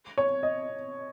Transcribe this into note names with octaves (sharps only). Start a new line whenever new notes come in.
C#5
D#5